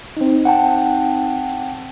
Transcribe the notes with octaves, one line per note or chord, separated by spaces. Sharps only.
C4 D#4
F#5 G5 A5